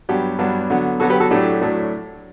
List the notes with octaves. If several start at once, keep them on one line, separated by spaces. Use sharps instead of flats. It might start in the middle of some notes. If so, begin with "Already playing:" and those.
G2 F#3 B3 D4 G4
G2 F#3 B3 D4
D3 F#3 B3
D3 F#3 B3 F#4 A4
G4 B4
F#4 A4
A2 F#3 A3 D4 G4
A2 F#3 A3 D4